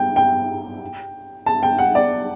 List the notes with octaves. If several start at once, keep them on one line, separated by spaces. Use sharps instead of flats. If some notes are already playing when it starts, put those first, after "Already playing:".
Already playing: G5
G5
A5
G5
F#5
D5